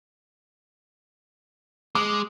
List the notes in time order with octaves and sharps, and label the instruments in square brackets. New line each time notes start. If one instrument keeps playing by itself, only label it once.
[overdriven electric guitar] G#3 [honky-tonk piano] D6